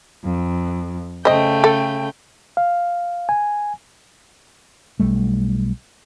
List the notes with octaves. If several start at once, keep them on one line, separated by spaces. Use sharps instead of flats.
F2
C#3 A3 C5 D#5 G5
A4
F5
G#5
B1 G3 A3